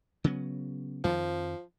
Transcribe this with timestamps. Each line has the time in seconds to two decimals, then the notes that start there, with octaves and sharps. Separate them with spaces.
0.24 C#3 F#3 B3
1.04 F2 D#3 F3